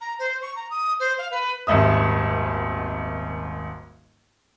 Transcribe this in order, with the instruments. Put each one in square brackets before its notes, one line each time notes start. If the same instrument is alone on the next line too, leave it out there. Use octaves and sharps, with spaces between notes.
[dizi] A#5
C5
C#6
A#5
D#6
C5
F5
B4
[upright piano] D#1 G#1 G#2 E5 D#6